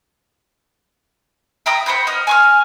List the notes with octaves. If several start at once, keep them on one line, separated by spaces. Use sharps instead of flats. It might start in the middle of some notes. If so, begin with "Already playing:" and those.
E5 G5 A#5 D#6
C5 F#5 B5 G6
D#5 A#5 D#6 F6
G#5 C#6 F6